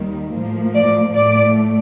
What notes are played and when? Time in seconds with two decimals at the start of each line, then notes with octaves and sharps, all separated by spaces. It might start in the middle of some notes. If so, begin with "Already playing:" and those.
Already playing: D#2 D#3 G3
0.33 A2 F3 A#3
0.74 D5
1.15 A2 A3 D5